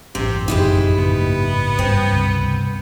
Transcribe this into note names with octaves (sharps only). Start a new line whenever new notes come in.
A1 F#2 C3 C4
F#1 B1 F2 G#2 D#4 E4 G4
G#2 C#3 A#3 B3
G2 C4
C#2 C3